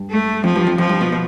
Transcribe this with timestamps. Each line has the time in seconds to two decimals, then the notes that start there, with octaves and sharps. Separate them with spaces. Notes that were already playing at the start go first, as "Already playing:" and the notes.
Already playing: G2
0.10 A3
0.44 F2 F3
0.56 G2
0.67 F2
0.78 F2 F3
0.89 G2
1.01 B2
1.12 B2